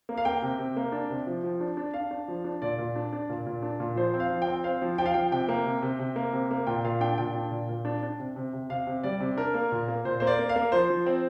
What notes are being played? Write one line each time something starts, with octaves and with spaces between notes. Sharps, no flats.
A#3
F5
A#3 G5
C3
C3
A#3
D4
C3
F3
F3
D4
D4
D4 F5
D4
F3
D4
A#2 D5
A#2
D4
D4
A#2
A#2
D4
A#2
F3 C5
C4
F5
F3
G5
C4
C4 F5
F3
F3 G5
F5
F3 G5
C3 G5
A#3
C3
C3
C3
A#3
C3
A#3
A#2 G5
A#2 F5
D4 G5
A#2 G5
D4
A#2
A#2
D4
D4
C3
C3
C3
C3 F5
C3
G3 D5
C3
D4 A#4
A#3
A#2
A#3
A#2 C5
A#3 C5
D5
A#3
F5
A#3
F3 C5
F3
C4